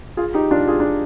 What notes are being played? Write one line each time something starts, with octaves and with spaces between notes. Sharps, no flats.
F4 G#4
D#4 G4
D4 F4
F4 G#4
D4 F4